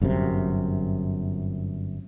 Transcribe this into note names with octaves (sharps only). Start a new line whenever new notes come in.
G1 F#2 A2 C3